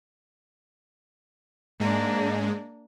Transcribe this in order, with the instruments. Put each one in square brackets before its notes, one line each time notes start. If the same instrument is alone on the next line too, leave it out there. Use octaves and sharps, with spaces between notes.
[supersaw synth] G#2 G#3 [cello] A#3 D4